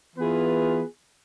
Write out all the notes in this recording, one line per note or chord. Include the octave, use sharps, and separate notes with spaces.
E3 B3 F4 G#4 B4